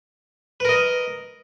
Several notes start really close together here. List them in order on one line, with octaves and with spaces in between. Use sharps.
B4 A#4 D#5